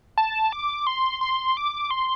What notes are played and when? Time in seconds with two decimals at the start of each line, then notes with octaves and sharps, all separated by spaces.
0.18 A5
0.52 D6
0.87 C6
1.21 C6
1.57 D6
1.91 C6